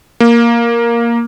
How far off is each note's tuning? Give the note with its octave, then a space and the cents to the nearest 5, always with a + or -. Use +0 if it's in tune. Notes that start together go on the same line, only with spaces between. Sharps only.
A#3 +5